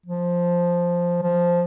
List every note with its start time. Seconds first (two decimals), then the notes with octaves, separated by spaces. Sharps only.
0.06 F3
1.22 F3